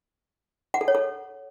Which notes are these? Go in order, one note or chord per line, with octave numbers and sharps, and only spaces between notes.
F#5
A4
C#5
A4